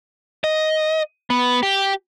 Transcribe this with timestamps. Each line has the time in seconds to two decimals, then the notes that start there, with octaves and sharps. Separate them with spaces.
0.44 D#5
1.30 B3
1.63 G4